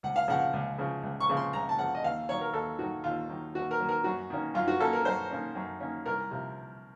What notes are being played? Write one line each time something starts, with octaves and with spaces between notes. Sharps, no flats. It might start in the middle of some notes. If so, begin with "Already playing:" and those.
C#2 F#5
F5
C#3 F3 F#5
C#2
C#3 F3
C#2
C#6
C#3 F3
C6
C#2 A#5
A5
C#3 F3 F#5
D#5
D#2 F5
D#3 F#3 C#5
A#4
D#2 A4
D#3 F#3 F#4
D#2 F4
D#3 F#3
D#2 F#4
A#4
D#3 F#3
A#4
F#2 F#4
D#3 A#3 C#4
F#2 F4
F#4
D#3 A#3 C#4 A4
A#4
F#2 C5
D#3 A#3 C#4
F#2
D#3 A#3 C#4
C2 A#4
C3 F3